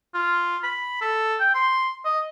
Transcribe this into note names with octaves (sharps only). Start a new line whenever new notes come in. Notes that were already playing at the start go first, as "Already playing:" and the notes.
F4
B5
A4
G5
C6
D#5